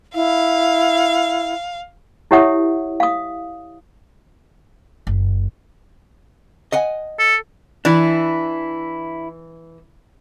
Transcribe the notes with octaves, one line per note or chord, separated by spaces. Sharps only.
E4 F5
E4 G4 C#5 E5 F#5 D#6
F5 D#6
F#1
D#5 F#5 G#5
A4
E3 D4 E4